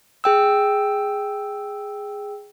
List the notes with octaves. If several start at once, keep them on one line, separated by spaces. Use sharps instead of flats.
G#4 G5 E6